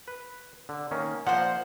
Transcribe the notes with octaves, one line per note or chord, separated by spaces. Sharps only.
B4
D3
D#3 A#3 C#4
F3 A#3 C5 F#5